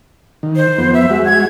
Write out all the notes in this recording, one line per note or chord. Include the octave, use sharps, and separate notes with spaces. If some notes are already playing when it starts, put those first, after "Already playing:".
D#3
C5
F2 B3
E5
G#3 F#4
G#6